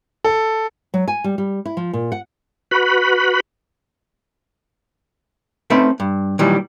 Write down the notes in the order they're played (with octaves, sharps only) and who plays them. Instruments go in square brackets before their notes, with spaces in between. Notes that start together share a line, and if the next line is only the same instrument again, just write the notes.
[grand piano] A4
[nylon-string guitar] F#3
G#5
G3
G3
E4
F3
A#2
F#5
[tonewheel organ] F#4 B4 B5
[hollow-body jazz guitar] A3 C4 C#4 D#4 B4 E5
G2
A#2 D#3 E3 F#3 G3